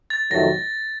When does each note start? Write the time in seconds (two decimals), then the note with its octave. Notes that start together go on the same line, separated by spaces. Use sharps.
0.10 A6
0.31 F2 C3 D#3 F#3 A3 A#6